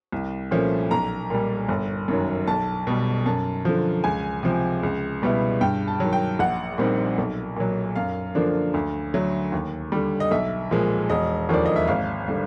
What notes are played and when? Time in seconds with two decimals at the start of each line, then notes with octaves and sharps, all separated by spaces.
0.12 C2
0.51 A#2 F3 A3 C#4
0.91 B1 A#5
1.30 A#2 G3
1.68 G1
2.08 F#2 D#3 F#3
2.47 B1 A5
2.87 B2 G3
3.26 F#2 A5
3.65 D3 F3
4.04 C#2 G#5
4.43 C3 F3
4.83 C#2
5.22 B2 G3 B3 E4
5.61 G2 G5
5.88 A5
6.00 D#3 F#3
6.13 G5
6.39 A#1 F#5
6.78 A#2 G3 C4 D#4
7.18 B1
7.56 A#2 F#3
7.95 F#2 F5
8.35 D3 F3 A#3 D4
8.74 D2
9.14 D3 F#3 A3
9.52 D#2
9.92 D3 G3
10.20 D#5
10.31 B1 E5
10.71 A#2 F3 G#3
11.10 E1 D#5
11.49 D#2 D3 F3 A#3 D5
11.66 D#5
11.76 E5
11.88 G#1 F5
12.28 D3 G3